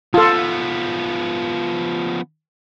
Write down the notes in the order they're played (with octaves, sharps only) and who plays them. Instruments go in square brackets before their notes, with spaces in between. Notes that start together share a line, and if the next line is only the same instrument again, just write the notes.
[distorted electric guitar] F3 B3 [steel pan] F4 A4